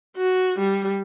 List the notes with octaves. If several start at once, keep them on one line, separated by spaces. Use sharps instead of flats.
F#4
G3